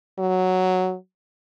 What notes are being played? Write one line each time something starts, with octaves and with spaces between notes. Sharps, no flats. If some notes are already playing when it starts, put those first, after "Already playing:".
F#3